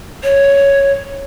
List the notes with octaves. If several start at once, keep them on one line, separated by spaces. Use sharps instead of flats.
C#5